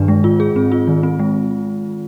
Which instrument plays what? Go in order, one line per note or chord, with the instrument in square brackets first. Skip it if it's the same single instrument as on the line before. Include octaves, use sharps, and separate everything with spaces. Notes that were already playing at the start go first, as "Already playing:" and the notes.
Already playing: [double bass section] G2 [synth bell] D#3 D4
[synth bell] G#3
[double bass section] G#2 [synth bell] F4
[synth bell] G#4
[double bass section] G#2 [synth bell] C4
[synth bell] F4
D#3
C4
G#3